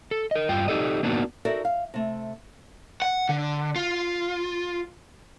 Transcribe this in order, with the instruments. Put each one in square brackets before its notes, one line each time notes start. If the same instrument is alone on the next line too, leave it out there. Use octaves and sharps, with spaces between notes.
[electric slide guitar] A4
A#4 D#5
G2 F4 G5
D#4 E4 G4 A4 D5 D#5
A#3 B3 D4 D#4 F#4 A#4
[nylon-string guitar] D#4 F#4 A4 A#4 D5 E5
F5
C3 A3
[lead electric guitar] F#5
D3
F4